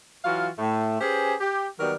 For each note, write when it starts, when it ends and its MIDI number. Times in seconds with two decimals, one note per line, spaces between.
0.24 0.49 52
0.24 0.49 54
0.24 0.49 65
0.24 0.49 66
0.24 0.49 77
0.57 0.99 45
0.57 0.99 57
1.00 1.34 61
1.00 1.34 67
1.00 1.34 68
1.00 1.34 71
1.00 1.34 72
1.41 1.67 67
1.79 1.94 51
1.79 1.94 54
1.79 1.94 55
1.79 1.94 59
1.79 1.94 70